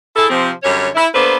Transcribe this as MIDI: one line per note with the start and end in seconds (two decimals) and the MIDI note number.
0.16 0.30 64
0.16 0.30 68
0.16 0.30 69
0.30 0.51 48
0.30 0.51 53
0.30 0.51 60
0.63 0.89 42
0.63 0.89 50
0.63 0.89 55
0.63 0.89 73
0.95 1.07 64
1.15 1.36 58
1.15 1.36 59
1.15 1.36 62
1.15 1.36 69
1.15 1.36 71
1.15 1.36 72